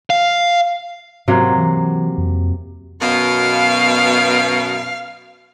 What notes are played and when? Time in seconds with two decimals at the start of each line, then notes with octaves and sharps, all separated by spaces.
0.10 F5
1.28 G#2 C3 F#3 A#3
1.58 E3
2.18 F2
3.01 F#2 B2 F5